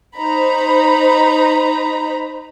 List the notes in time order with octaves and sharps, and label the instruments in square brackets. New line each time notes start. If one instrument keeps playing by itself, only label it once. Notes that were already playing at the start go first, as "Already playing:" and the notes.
[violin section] D#4 C5 A#5 B5